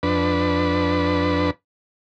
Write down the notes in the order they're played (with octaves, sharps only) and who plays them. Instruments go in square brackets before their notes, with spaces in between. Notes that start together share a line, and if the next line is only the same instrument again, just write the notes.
[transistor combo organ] F2 D4 B4